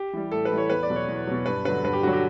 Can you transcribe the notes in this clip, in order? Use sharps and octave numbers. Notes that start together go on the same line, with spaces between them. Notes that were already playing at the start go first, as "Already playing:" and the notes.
Already playing: G4
E3 G3
A2 A4
B4
E3 G3
C#5
E2 B4
D5
B2 F#3
C#5
E2
B2 F#3
G2 B4
D3 F#3 B4
G2 B4
G4
D3 F#3 F#4
G4